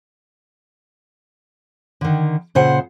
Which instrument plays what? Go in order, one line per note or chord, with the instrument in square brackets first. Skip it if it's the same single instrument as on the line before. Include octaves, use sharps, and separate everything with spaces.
[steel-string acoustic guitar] D3 D#3
A#2 C#3 C5 F#5